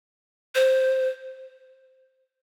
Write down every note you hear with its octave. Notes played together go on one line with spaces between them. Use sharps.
C5